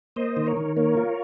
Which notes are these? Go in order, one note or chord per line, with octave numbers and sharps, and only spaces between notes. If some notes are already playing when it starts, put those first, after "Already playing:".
A#3 C5 D#5
D#3
A#4 C#5
D#3
A#3 A#4 C#5
F4